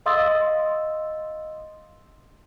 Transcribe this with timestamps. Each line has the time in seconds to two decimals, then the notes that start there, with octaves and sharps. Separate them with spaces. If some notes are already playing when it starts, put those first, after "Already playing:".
0.06 D#5 F5 C6 D#6 E6 A6